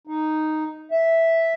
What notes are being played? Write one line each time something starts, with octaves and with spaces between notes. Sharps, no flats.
D#4
E5